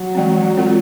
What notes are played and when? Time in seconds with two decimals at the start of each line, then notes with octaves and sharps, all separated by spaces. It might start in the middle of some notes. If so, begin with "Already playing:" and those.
Already playing: F#3
0.15 E3 G#3 C4
0.57 G#3 C4 F4 A4